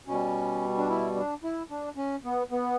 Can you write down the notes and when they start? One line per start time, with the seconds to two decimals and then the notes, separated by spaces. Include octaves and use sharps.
0.07 B2 G3 C#4
0.78 D4
0.89 E4
1.15 D4
1.44 E4
1.70 D4
1.97 C#4
2.24 B3
2.51 B3